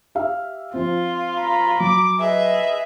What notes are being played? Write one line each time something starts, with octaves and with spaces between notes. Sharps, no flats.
G4 E5 F5
F3 C4 F4
A#5 B5
F#3 D6
G#4 B4 D#5 E5